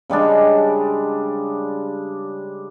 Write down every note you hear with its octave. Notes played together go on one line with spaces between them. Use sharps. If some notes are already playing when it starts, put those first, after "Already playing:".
C#3 G3 G#3 D4